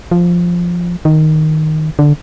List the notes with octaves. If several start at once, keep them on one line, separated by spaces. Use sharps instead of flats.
F3
D#3
D3